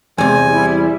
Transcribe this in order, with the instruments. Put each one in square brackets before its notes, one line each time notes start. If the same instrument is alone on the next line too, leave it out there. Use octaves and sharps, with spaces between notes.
[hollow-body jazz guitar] E2 C3 [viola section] G#3 [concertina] G#5
[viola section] G3 E4